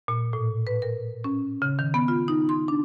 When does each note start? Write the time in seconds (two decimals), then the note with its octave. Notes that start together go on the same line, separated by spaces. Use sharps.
0.08 A#2
0.33 A2
0.67 B4
0.82 A#4
1.24 C#4
1.62 C#3
1.79 D#3
1.94 B3
2.08 F4
2.28 D#4
2.49 C6
2.68 D4